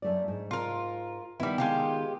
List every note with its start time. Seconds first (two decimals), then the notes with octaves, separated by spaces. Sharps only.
0.02 F#2 A3 D5
0.28 G#2
0.51 F4 A#4
1.40 D#3 G3 B3 E4
1.58 G#3 F4 G4